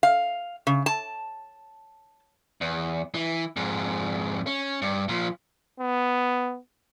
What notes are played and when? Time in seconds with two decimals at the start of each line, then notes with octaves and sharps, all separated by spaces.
0.03 F5
0.67 C#3
0.86 A5
2.61 E2
3.15 E3
3.56 F2 G#2
4.47 C#4
4.82 G2
5.09 A#2 F3
5.80 B3